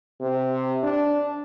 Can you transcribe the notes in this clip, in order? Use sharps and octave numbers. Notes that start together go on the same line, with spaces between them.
C3
D4